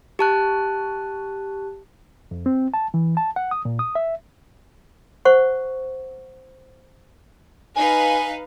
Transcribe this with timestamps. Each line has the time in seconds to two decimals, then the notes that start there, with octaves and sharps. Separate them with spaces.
0.19 G4 A5 F#6
2.31 F2
2.46 C4
2.74 A5
2.94 E3
3.17 A5
3.36 F#5
3.51 D#6
3.65 A#2
3.79 D#6
3.95 E5
5.25 C5 F#5 C#6
7.76 D#4 B4 F5 G#5